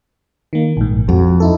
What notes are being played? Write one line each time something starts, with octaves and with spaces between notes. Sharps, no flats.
D#3 A#3
A#1 G#2
F2 F#4
D#4 E4 A4